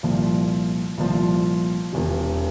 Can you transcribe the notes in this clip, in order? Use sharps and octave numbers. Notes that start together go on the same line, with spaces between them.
C2 A#2 F3
C2 A#2 F3
E1 E2 C3